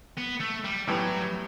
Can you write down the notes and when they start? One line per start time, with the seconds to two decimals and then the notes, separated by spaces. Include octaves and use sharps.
0.17 B3
0.41 A3
0.65 G3
0.87 A2 E3 F#3 G3 B3